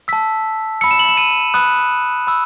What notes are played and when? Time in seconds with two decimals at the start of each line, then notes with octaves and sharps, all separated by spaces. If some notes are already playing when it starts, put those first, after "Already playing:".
0.08 A5 E6 B6
0.81 B5 E6 C#7
0.91 E7
0.99 F#7
1.09 E7
1.17 D#7
1.54 B5 D#6 F#6
2.27 B5 E6